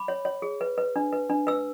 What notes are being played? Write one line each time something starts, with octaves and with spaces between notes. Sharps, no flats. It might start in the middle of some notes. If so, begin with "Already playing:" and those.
Already playing: B5 D6
C#5
C#5
G#4
B4
B4
D4
B4
D4
B4 E6